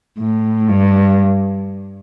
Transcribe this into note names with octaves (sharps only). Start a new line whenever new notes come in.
A2
G2